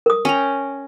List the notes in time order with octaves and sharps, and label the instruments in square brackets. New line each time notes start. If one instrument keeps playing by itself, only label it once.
[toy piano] A#4 D#6
[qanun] C#4 G5 A#5